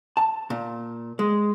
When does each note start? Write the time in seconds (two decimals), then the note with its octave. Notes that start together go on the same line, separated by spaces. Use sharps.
0.17 A5
0.50 A#2
1.19 G#3